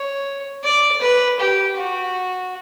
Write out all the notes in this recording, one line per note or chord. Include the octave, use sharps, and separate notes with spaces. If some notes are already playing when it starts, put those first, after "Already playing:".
Already playing: C#5
D5
B4
G4
F#4